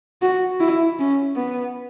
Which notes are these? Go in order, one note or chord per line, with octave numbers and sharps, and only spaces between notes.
F#4
E4
C#4
B3